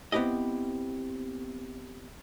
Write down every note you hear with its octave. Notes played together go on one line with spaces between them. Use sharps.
B3 C4 E4 G4 D#5